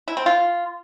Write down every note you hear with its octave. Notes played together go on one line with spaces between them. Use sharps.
E4
C4
F4